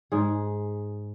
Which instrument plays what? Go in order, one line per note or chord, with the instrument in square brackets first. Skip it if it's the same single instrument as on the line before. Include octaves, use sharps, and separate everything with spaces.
[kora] G#2 G#4